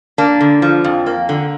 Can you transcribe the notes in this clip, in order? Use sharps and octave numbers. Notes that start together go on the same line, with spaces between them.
A#3 D4
D3
F3
F2
A#3
D3